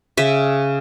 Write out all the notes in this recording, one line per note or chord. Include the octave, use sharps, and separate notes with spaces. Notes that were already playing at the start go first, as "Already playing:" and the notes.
C#3 E5